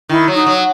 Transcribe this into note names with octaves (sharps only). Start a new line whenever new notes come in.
D#3 E4
F#3
D#4
F#3